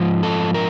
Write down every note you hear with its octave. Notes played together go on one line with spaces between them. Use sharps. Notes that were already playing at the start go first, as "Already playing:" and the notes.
Already playing: G#2 F3
A4
A#4